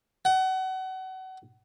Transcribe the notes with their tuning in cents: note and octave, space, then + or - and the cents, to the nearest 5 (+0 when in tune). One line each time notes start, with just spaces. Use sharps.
F#5 +30